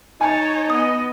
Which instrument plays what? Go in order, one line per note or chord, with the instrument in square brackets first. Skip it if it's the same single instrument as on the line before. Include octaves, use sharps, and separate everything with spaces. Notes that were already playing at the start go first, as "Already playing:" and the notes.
[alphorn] D#4 [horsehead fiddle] C#5 A5 [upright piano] G#5
[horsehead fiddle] B3 D#5 [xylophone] D#6